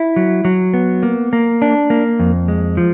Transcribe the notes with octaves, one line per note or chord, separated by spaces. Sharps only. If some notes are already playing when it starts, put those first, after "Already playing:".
Already playing: E4
F#3
F#3
B3
A#3
A#3
D4
A#3
F2
G#3
F3